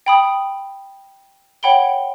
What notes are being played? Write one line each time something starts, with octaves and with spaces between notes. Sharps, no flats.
G5 B5 D#6
C#5 F#5 G5 B5 D7 G7